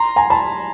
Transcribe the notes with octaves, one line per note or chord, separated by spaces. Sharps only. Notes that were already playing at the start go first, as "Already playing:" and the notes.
Already playing: A#5 C6
G#5 A#5
A5 B5